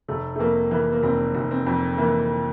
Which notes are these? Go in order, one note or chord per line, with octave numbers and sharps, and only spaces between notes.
F1 A3
A3
F2 A#3
E3 A#3
A#3
F1 C4
F1
C4
F2
E3 A#3